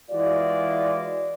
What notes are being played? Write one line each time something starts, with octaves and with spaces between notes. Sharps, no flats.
E3 G#3 F4 F#4 D5